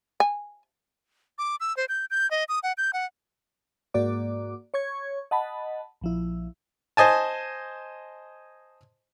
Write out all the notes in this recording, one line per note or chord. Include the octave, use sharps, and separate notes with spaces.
G#5
D6
E6
C5
G6
G6
D#5
D#6
F#5
G6
F#5
G#2 A#3 F#4 D5 D6
C#5 C#6 G#6
D#5 F#5 A5 B5
A#1 F3 E4
C5 D#5 G#5 A5